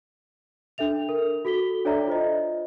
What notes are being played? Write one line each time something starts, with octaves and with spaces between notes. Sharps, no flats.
D4 A4 E5 F7
A#4
F#4 A4 B6 G7
D4 A4 C#5 D5 E5 A#5
F4 C5 D#5